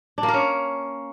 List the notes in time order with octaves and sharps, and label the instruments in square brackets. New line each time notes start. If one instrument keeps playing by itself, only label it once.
[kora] D4
A#3
A#4
C#4